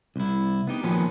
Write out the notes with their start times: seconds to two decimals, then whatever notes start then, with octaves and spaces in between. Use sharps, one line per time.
0.16 C2 E4
0.67 B3 D#4 G4
0.83 A#2 D#3 F3 F#3 G#3 B3